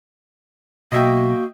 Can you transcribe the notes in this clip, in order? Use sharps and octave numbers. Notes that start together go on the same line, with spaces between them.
B1 B2 A#3 F#4 D#5 E5 G5